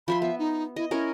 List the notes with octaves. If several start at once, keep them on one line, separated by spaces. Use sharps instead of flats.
F3 E5 B5 C6
B3 E5
D#4
E4 D#5
C#4 E4 A#4 C#5